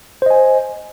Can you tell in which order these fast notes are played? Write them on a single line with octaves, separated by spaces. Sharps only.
C5 D#5 G#5